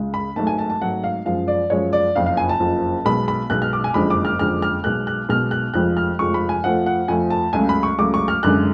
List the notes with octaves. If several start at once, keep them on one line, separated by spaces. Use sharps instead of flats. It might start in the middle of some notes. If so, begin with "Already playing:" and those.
Already playing: C#2 C#3 G#3
B5
G#1 G#2 F#3 A3 A5
G#5
A5
A5
G#1 G#2 F#3 A3 F#5
F5
F#2 F3 G#3 F5
D5
F#2 F3 G#3 C#5
D5
F#1 F2 F3 F5
F5
G#5
A5
F#1 F2 F3
B1 B2 G#3 B5
B5
B1 B2 G#3 F#6
F6
D6
G#5
F#1 F2 D3 G#3 B5
D6
F6
F#1 F2 D3 G#3 F6
F6
B1 B2 G#3 F#6
F#6
B1 B2 G#3 F6
F#6
F1 F2 F3 G#3 F#6
F6
F1 F2 F3 G#3 C#6
B5
G#5
F2 F3 A3 F#5
F#5
F2 F3 A3 G#5
A5
C#2 C#3 F#3 A3 G#5
B5
C#6
C#2 C#3 F#3 A3 D6
C#6
F6
G#1 F#2 D3 G#3 F#6